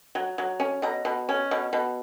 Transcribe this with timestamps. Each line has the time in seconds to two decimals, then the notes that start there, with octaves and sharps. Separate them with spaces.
0.15 F#3
0.38 F#3
0.60 C#4
0.82 B2 A#5
1.05 B2
1.29 C#4
1.51 B2
1.73 B2